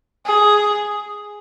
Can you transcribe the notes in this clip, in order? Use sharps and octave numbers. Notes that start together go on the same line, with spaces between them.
G#4